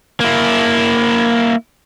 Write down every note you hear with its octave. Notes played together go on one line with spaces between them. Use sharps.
A#3 E4